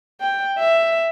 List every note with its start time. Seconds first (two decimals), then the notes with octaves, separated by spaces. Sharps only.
0.21 G5
0.59 E5